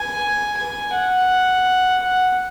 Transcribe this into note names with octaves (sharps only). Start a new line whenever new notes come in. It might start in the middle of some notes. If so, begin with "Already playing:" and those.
Already playing: G#5
G#5
F#5
F#5